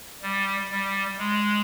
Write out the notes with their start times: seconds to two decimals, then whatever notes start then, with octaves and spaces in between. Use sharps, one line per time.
0.22 G3
0.71 G3
1.19 G#3